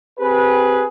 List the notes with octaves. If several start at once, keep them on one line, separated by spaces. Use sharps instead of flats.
C4 G4 G#4 B4